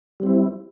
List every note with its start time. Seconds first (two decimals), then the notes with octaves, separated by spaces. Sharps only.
0.20 G3
0.23 C4
0.26 E4